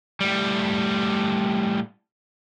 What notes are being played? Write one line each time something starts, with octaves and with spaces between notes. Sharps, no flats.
A2 G3